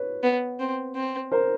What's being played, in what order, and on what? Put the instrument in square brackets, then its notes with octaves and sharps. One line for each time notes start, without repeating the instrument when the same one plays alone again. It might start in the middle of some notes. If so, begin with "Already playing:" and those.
Already playing: [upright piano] B4 C#5
[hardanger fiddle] B3
C4
C4
[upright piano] A#4 C5